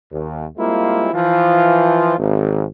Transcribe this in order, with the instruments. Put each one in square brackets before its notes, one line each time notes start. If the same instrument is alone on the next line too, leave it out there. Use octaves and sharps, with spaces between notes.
[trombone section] D#2
G3 G#3 A#3 C4 E4 F4
E3 F3 F4
G#1